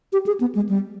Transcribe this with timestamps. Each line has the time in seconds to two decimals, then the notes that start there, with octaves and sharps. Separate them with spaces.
0.13 G4
0.26 G#4
0.40 B3
0.55 G#3
0.69 G3